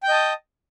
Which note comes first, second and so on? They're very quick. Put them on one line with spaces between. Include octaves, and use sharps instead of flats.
G5 G6 D#5 A5 D#6